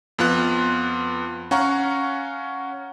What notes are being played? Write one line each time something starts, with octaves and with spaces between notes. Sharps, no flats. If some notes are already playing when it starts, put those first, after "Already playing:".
F2 B3 F4 F#6
C#4 F5 F#5 A#5 C#6